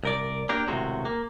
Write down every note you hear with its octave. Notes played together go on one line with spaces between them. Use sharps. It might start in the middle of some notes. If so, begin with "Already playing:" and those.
C2 A#4 D5
A#3 D4 G4 A#4
B1 A2 C3 D#3 G#3 F#4
A#3